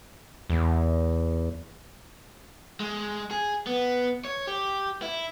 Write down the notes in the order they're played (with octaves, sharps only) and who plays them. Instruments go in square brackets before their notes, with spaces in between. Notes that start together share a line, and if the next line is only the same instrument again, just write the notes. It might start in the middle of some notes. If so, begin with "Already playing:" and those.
[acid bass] E2
[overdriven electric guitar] G#3
G#4
B3
C#5
G4
E4